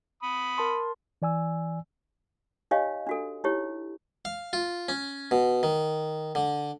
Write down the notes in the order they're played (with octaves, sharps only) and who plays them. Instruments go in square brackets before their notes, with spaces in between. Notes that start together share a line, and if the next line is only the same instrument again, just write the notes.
[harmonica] B5 D#6
[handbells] A#4 A5 C6
[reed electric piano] E3 D5 G#5 E6
[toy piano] D#4 G4 C#5 D#5 F5 G#5
D4 F#4 A4
D#4 E4 G4 C#5
[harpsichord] F5
F4
C#4
B2
D#3
D3